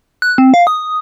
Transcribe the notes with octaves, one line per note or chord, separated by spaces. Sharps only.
F#6
C4
F5
D#6